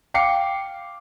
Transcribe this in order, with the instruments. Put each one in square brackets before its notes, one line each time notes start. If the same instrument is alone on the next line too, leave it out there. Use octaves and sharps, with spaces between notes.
[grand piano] F5 G5 D6 C7 C#7